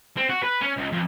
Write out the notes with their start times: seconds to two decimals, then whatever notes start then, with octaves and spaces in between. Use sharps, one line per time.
0.17 C4
0.30 F#4
0.43 B4
0.61 C#4
0.77 C#2
0.92 F2